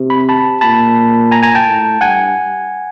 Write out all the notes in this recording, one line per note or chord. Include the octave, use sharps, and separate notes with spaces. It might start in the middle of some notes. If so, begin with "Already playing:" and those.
Already playing: C3
B5
A5 B5
A#2 A5 B5
G#5 A#5
G#5 A#5
G5 A5
A2
G2 F#5 G#5